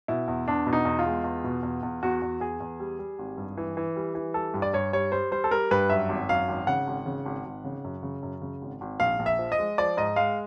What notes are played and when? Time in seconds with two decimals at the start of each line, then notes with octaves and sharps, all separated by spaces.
0.08 B2 E4
0.28 E2
0.48 E2 D4
0.67 B2
0.73 D#4
0.85 E2
0.99 F4
1.06 G#3
1.24 E2
1.44 B2
1.63 E2
1.83 E2
2.03 E2 F#4
2.22 E2
2.40 E2 G#4
2.60 E2
2.80 G3
2.99 G3
3.19 G#1
3.38 G2
3.57 E3
3.77 E3
3.96 G3
4.15 E3
4.34 G3 A4
4.54 G2
4.62 D5
4.73 G2 C#5
4.93 G3 C#5
5.12 G3 C5
5.31 G3 C5
5.44 A4
5.51 G3 A#4
5.71 G2 B4
5.90 F#2 E5
6.09 G#1
6.29 F#2 F5
6.48 G#1
6.67 C#3 F#5
6.87 G#1
7.06 C#3
7.26 G#1
7.45 G#1
7.64 C#3
7.84 F#2
8.03 C#3
8.23 F#2
8.42 C#3
8.62 G#1
8.81 G#1
9.00 A#1 F5
9.19 A#1
9.26 E5
9.38 F3
9.52 D#5
9.58 G#3
9.78 F3 D5
9.97 G#2 D#5
10.16 G#3 F5